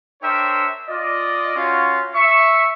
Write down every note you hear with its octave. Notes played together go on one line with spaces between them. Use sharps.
D4 A#4 C5 C#5 E5 G5
F4 D5 D#5
C#4 F4 F#4
E5 C#6